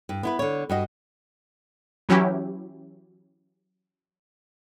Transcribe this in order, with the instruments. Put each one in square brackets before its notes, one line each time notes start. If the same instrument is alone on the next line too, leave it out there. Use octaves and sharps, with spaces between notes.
[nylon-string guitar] G2
B3 E4 B4
D3 C#5
G2 F#4 D#5
[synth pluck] E3 F#3 C#4 E4 G4